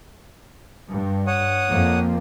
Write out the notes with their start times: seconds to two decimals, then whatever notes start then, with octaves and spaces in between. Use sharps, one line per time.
0.90 G2
1.27 C#5 F#5 D#6
1.69 F2 F3 A#3